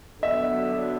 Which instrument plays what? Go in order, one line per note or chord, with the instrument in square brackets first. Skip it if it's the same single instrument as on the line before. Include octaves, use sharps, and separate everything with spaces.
[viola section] D3 F#3 B3 D4 [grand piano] E5